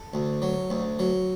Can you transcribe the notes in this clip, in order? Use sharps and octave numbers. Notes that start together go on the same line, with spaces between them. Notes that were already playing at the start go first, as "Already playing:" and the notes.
Already playing: A4
D2
F#3
D2
F#3